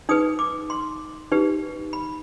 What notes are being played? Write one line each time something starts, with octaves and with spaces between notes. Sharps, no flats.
D#4 G#4 B4 D#6
D6
C6
D#4 G4 B4
B5